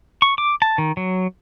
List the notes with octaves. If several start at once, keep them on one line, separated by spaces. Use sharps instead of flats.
C#6
D6
A5
D#3
F#3